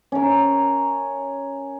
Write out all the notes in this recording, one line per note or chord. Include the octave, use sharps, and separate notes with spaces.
C#4 A#4